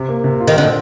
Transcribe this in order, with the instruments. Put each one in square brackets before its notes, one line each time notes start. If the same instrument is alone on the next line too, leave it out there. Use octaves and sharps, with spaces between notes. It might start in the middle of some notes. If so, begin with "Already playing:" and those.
Already playing: [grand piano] C3
A#3
C3
F4
[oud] D#3
[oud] D3 [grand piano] C4